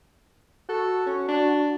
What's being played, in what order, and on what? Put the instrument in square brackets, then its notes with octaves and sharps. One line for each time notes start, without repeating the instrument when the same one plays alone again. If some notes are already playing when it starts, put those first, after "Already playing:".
[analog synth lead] F#4 [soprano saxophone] A4
[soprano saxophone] C#4
D4